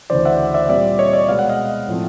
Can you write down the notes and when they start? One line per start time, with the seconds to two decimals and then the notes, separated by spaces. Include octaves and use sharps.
0.10 D2 C#3 E3 C5 D5
0.25 E5 F#5
0.54 D5 E5
0.69 A#2 G3 C4 D5 E5
0.99 C#5 D#5
1.13 D5 E5
1.29 B2 G#3 B3 F5
1.39 F#5
1.49 D#5 F5
1.88 A2 F3 A3 C4